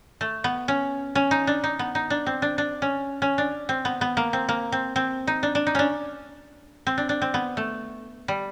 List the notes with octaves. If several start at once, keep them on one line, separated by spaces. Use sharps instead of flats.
A3
B3
C#4
C#4
D#4
D4
D#4
B3
D#4
D4
C4
D4
D4
C#4
C#4
D4
C4
B3
B3
A#3
C4
A#3
C4
C4
D#4
D4
D4
D#4
C#4 D4
C4
D4
D4
C4
B3
A3
G3